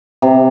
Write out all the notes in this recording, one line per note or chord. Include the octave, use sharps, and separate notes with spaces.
C3